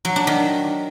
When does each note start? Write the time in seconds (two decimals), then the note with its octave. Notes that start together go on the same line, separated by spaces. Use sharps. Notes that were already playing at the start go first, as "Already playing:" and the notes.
0.05 F#3
0.16 D4
0.27 D#3